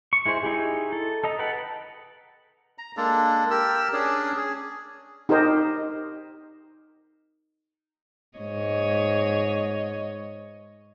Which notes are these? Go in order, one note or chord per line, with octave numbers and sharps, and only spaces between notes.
C#6
G#3 E4 G#4 C5
D#4 E4 G4 G#4
A4
A4 D#5 A#5
B4 F#5 G5 A5 B5
A#5
G#3 A#3 D4 A4
G4 A#4 E6
C#4 D4 G#4 D5
G#4
D#4 G4 A#4 C5 D#5
G#2 C#5 D#5